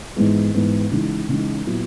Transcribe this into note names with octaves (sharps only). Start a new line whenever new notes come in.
G#2 E3 G#3 B3
G#2 E3 G#3 B3
C#3 E3 G#3 D#4
C#3 E3 G#3 D#4
A#2 F#3 B3 E4